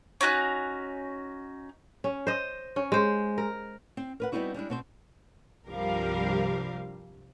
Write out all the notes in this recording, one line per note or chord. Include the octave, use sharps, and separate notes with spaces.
C#4 D#4 F#4 F#6
C#4
C5 D#5
C#4
G#3 C5
A#4
C4
A#4 B4 F#5
G3 B3 C4 D#4 E4 F#4
G3 G#3 D4 E4
B2 C4 C5
C2 G2 F3 G3 A#4 F5